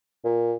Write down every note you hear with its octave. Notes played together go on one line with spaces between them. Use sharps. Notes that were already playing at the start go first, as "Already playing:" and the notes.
A#2